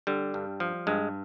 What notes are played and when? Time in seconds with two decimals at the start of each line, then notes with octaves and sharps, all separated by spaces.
0.07 D3 G3
0.34 G2
0.60 F3
0.87 G2 G#3